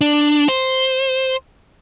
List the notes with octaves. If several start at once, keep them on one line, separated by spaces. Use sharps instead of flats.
D4
C5